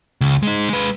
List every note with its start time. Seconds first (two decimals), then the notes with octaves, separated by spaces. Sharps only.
0.21 C#2
0.43 G#3 D#4
0.70 G#3 B4